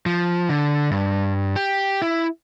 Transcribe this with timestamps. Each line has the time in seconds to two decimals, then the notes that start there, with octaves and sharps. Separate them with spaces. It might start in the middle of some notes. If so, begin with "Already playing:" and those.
0.06 F3
0.49 D3
0.91 G2
1.56 G4
2.02 E4